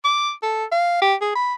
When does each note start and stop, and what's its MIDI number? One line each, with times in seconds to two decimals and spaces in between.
0.05 0.32 86
0.43 0.65 69
0.72 0.98 77
1.02 1.15 67
1.21 1.34 68
1.36 1.54 83